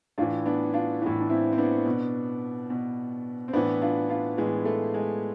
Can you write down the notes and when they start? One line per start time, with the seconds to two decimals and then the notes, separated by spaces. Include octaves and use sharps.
0.18 A2 E3 D4 F4
0.46 B3 D4
0.74 D4 F4
1.02 A2 E3
1.21 D4
1.30 C4 E4
1.53 C4
1.58 B3 D4
1.86 B2
2.70 B2
3.48 C4
3.53 A2 E3 B3 D4
3.82 D4 F4
4.10 D4 F4
4.37 A2 E3 G#3 B3
4.65 A3
4.94 G#3